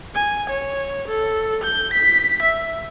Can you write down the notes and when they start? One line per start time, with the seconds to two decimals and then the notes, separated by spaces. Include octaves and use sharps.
0.15 G#5
0.50 C#5
1.08 A4
1.64 G6
1.93 B6
2.42 E5